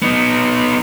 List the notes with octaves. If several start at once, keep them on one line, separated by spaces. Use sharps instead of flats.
B3 D#4